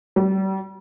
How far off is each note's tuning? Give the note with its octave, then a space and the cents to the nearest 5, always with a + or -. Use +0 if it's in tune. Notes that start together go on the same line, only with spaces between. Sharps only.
G3 -35